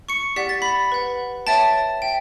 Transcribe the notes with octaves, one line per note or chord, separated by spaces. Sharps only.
C#6 C#7
G4 D5 F#5 B6
A6
B5 B6
B4 F#5
C#5 E5 G5 A5 A6
E5 G5